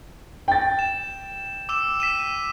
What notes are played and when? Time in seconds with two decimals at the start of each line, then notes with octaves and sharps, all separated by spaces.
0.48 G5 A6
0.79 E7
1.69 D6 E6 E7
2.00 B6 D#7 E7